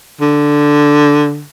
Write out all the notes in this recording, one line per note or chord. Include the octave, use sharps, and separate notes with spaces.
D3